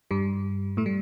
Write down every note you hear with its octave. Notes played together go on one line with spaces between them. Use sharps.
G2 G3
A2 A3
G3